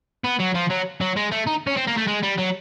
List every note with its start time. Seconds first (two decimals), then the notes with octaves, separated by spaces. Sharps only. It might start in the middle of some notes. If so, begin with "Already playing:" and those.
0.25 B3
0.40 F#3
0.55 F3
0.70 F#3
1.01 F#3
1.16 G#3
1.31 A3
1.47 D#4
1.67 C#4
1.77 C4
1.88 A#3
1.98 A3
2.08 G#3
2.23 G3
2.38 F#3